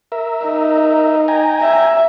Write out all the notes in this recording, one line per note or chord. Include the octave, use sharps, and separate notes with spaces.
A#4 E5
D#4
G5 G#5 A#5
E5